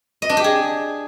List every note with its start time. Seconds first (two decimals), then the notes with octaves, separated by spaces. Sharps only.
0.22 D#5
0.29 D4
0.37 G4
0.44 G#4